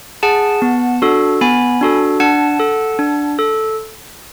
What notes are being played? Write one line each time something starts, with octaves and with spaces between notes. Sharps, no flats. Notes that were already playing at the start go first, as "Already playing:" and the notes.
G#4 F#5 A5
B3
D4 F#4 A4
B3 G#5 B5
D4 F#4 A4
D4 F#5 A5
A4
D4
A4